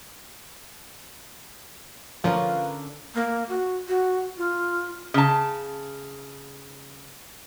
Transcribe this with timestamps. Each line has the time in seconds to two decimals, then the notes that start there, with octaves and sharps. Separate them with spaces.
2.24 D3 F3 C#4 F4 A#4 B4
3.15 A#3
3.49 F#4
3.88 F#4
4.38 F4
5.14 C#3 A5